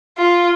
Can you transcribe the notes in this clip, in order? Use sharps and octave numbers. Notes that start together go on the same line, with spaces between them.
F4